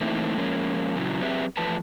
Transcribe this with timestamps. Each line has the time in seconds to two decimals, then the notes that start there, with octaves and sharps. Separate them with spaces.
0.01 E3 A3 A#3 C4 D#4 E4
0.37 F3 G#3 A#3 C#4
0.96 A#2 C#3 F#3 E4
1.21 F#3 C4 G4 G#4 B4 E5
1.57 E2 F3 A3 B4 A5